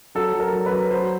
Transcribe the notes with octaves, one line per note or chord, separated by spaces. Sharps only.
F#3 A4
F#3
A#4
F#3
B4
F#3
F#3 C5